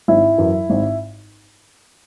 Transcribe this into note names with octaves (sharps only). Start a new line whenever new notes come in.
G#1 E4
F#2 E3
G#1